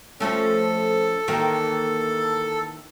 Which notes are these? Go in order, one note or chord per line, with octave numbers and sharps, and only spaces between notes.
F3 A3 C#4 A4
D#3 E3 A#3